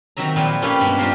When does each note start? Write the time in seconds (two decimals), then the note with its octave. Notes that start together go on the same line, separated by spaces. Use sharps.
0.17 C3 D#3 F#3 E5 A#5
0.36 A#2 F3 E5 B5
0.62 A#3 C#4 F4 G4 A4 B4
0.80 G2 B2 G#3 A#3
0.98 D4 F4 G4 A#4 C5